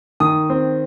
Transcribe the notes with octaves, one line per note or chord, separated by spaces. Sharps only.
D#3 D#6
C4